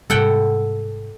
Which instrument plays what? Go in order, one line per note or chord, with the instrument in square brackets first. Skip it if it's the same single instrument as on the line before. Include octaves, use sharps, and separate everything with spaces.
[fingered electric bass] G#2 C3 G3 [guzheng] A4 F#5 G5